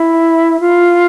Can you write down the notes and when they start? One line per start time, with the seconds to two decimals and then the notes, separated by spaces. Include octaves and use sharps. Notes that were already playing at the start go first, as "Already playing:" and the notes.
Already playing: E4
0.60 F4